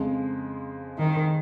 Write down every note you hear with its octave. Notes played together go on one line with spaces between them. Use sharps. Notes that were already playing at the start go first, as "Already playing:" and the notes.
Already playing: F2 C#3 G#3
D#3